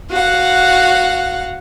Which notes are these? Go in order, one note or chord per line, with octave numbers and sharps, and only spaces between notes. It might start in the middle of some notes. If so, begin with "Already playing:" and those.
F#4 F5 F#5